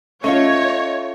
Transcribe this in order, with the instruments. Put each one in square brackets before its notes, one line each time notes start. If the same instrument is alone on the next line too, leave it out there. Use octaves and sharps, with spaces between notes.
[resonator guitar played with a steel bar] A3 F4 [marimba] C#4 [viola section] C#5 [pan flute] D#5